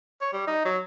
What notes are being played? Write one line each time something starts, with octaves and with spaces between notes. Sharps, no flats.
C#5
G3
D#4
F#3